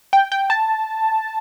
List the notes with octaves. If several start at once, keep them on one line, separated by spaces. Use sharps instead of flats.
G5
G5
A5